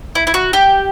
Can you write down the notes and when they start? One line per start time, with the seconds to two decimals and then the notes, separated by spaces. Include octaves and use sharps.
0.15 E4
0.27 E4
0.34 F#4
0.53 G4